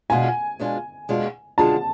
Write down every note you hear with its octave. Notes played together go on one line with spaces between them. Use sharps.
B2 G#3 D4 F4 G#5
B2 G#3 D4 F4
B2 G#3 D4 F4
B2 G#3 D4 F4 A5